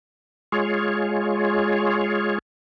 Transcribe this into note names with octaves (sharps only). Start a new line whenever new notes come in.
G#3 F4 G#4 C#5